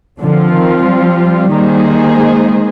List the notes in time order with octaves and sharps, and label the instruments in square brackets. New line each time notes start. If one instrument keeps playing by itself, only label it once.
[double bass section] D3 [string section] F3 C4 F4
[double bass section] D#3
G3
[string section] D#3 A#3 D#4 G#4 C5
[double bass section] G#3